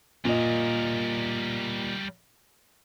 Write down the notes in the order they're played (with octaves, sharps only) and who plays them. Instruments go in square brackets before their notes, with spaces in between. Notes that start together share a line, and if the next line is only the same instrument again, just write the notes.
[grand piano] A#2 D#5 [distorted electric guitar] G3 A#4